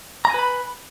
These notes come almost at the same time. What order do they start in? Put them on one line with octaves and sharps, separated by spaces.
A#5 G#5 B4 B5